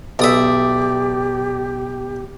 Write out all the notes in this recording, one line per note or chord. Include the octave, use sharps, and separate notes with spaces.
B1 G4 D5 E5 D#6